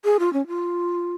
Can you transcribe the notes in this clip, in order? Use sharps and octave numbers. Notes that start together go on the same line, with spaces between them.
G#4
F4
C#4
F4